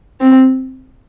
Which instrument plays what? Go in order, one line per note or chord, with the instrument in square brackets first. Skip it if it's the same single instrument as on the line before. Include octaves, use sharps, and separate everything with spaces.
[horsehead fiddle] C4